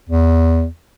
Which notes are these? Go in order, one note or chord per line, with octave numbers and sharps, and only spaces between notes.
E2